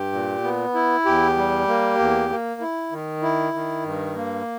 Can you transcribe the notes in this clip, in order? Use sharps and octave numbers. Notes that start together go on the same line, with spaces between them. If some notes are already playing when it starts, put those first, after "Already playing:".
Already playing: G2 G4
A#2
B3
E4
E2 G4
G3
A#3
E2
A#3
E4
D#3
E4
D#3
G2
A#3